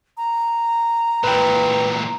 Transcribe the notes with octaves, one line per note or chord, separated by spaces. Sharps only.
A#5
A#2 E3 B4 G5